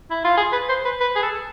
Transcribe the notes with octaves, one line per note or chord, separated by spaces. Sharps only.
E4
F4
G#4
B4
C5
B4
B4
G#4
A4